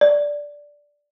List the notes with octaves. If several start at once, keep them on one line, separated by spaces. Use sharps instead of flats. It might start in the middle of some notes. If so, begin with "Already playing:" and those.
D5